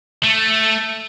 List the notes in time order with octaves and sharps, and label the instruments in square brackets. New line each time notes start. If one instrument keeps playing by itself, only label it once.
[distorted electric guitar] A3